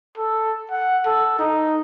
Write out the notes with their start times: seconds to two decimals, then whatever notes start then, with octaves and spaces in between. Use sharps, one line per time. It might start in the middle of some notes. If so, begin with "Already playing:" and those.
0.18 A4
0.71 F#5
1.06 A4
1.39 D#4